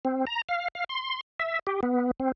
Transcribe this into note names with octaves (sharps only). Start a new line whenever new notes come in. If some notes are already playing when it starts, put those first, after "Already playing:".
C4
A#5
F5
F5
C6
E5
G4
B3
C4